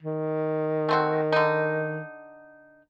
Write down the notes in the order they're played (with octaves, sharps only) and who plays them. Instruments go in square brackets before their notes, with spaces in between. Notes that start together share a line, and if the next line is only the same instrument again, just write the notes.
[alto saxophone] D#3
[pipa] A3 C4 F#4
D3 D#4